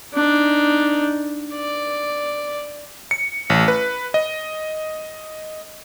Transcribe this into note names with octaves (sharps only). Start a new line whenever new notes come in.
D4 D#4
D5
C#7
A1
B4
D#5